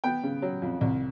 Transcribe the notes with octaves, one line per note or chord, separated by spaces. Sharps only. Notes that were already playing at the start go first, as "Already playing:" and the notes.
B3 G5
C#3
F#3
F2
C2